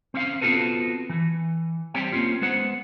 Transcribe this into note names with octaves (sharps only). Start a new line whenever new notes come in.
C4 C#4 F5
B3 C4 F4 F#4 A4 B4
E3
G3 C4 G4 C#5 G5
A#3 C4 C#4 F4
G#3 B3 C5 F#5